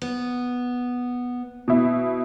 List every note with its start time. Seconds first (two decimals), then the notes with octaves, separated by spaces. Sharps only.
0.02 B3
1.68 B2 E4